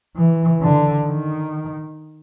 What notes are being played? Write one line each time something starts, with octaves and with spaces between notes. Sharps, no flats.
E3
D3
D#3